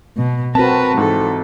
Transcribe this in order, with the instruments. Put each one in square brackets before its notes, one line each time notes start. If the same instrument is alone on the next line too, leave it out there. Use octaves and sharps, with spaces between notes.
[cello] B2
[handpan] C4 F#4 [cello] A#4 B4 [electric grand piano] A5
[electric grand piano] G#2 [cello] E3 A4